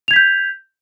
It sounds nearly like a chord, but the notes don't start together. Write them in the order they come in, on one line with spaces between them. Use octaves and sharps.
F7 G#6 B6 G6